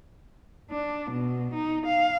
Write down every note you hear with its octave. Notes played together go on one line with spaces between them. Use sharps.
D4
B2
D#4
F5